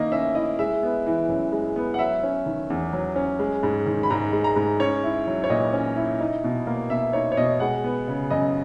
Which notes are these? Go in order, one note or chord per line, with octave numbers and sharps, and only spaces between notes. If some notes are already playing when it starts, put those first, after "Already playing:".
Already playing: D#3 A#3 E4 D#5
C#4 E5
E4 D#5
G#3 E5
B3
E3
F#2
G#3
B3
F#5
F#3 E5
C#4
D#3
E2
F#3
C#4
G#3
G#2
D#3
B5
G#2 A#5
G#3
A#5
G#2
C#4 C#5
E4
F#3
C#5
A#2 D#5
C#4
E4
D#4
B2
A#3
B2 E5
D#4 C#5
C#5
B2 D#5
G#3 F#5
B3
C#3
F#2 D#5